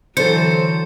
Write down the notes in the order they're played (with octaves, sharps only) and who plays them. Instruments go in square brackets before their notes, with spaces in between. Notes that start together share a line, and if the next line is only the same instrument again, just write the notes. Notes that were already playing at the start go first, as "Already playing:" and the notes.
[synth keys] D3 A4 [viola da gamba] E3 F#3 [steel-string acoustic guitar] C5 [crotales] C#7